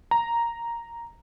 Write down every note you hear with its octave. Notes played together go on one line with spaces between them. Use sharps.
A#5